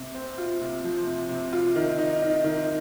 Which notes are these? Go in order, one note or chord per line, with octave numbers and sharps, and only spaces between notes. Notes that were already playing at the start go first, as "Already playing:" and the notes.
Already playing: C3
C4
F4
C3
F3
C3
C3
F4
D#3
D#4
D#4
D#3